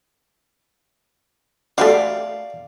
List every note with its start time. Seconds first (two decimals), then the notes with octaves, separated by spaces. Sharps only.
1.78 A3 F#4 G4 D5 F5